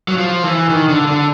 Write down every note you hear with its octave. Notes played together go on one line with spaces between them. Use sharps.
F#3
F3
E3
D#3
D3
D3